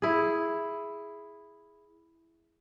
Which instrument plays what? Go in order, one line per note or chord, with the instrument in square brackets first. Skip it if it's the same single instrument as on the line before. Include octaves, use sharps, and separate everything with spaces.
[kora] E4 G#4